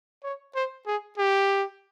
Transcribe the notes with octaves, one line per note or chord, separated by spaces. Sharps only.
C#5
C5
G#4
G4